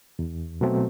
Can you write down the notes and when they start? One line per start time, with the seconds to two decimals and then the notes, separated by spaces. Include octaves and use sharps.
0.19 E2
0.61 B2 F#3 A3 C4